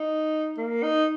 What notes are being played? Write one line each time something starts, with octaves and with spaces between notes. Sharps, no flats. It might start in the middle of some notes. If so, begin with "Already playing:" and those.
Already playing: D#4
A#3
D#4